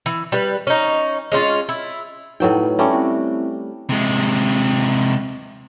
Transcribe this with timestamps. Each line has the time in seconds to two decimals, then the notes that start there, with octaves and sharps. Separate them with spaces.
0.06 E3
0.32 G3 B4
0.67 C#4 D#4
1.32 G#3 C#4 E4 F4
1.69 E4
2.40 A2 F#3 D#4 B4 C#5 G5
2.79 G3 A3 C#4 E5
2.93 C4 E4
3.89 C3 G#3